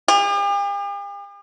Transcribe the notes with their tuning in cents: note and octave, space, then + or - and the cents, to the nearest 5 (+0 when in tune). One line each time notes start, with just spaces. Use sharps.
G4 +45